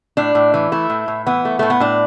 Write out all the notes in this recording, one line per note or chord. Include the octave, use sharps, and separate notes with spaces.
A2 D4
A2
E3
A3 E4
A2
A2
E3 B3
A3
A2 A3
B3
A2 D4